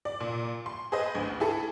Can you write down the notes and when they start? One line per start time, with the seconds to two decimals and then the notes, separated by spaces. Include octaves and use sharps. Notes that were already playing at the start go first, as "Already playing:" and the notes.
0.05 D5
0.20 A#2
0.66 C6
0.92 G#4 B4 C5 D#5
1.15 A1 D2
1.40 E4 G#4 A4